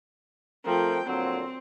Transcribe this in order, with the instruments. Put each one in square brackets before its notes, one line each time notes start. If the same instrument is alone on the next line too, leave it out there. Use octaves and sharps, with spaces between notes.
[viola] F3 G5 [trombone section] A3 C4 A#4
[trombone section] A#2 D3 F#3 [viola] C4